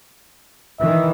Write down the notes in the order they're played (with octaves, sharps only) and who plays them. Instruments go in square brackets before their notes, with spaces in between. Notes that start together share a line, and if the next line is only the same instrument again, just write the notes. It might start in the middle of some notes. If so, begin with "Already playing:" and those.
[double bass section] D#3 E3 [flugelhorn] E5